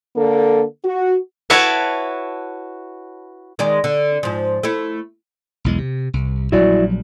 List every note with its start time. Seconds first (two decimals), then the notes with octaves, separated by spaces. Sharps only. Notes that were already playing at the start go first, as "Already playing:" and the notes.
0.17 D3 A#3 A4
0.85 F#4
1.50 E4 F#4 B4 C#5 E5 A5
3.59 D#3 G#3 D5
3.84 D3
4.23 G#2 F3
4.63 A3 E4
5.64 B1 E2 G#3
5.78 C3
6.13 C2
6.52 A#1 F#3 G3 E4 F#4 D5